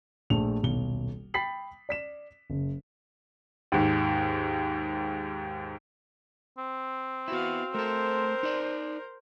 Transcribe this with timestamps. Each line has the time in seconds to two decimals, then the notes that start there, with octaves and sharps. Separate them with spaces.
0.30 A#1 A3 F7
0.63 D#1 B1 G7
1.34 G5 B5 A6 B6 C7 F#7
1.89 D5 B6 E7
2.50 F#1
3.72 D#2 G#2
6.58 C4
7.28 B3 E4 F#4 F5
7.74 A3 A4 A#4 C5
8.43 D#4 D5